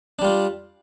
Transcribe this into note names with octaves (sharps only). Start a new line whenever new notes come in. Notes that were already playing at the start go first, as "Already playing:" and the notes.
G3 D4 F4